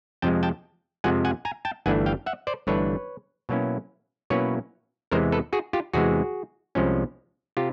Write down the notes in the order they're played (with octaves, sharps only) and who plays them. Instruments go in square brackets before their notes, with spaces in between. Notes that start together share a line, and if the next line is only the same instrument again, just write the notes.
[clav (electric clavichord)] F2 C3 F3 G#3 G5 A5
G5 A5
F2 C3 F3 G#3 F#5 G#5
F#5 G#5
G#5 A#5
G5 A5
G1 G2 E3 A3 D4 F#5 G#5
F5 G5
E5 F#5
C5 D5
G1 G2 E3 A3 D4 B4 C#5
B2 F#3 A#3 C#4 E4
B2 F#3 A#3 C#4 E4 B4 C#5
E2 C3 E3 G#3 A#4 C5
A4 B4
F#4 G#4
F4 G4
E2 C3 E3 G#3 F#4 G#4
C2 C3 F3 G#3 C#4
C3 F4 G4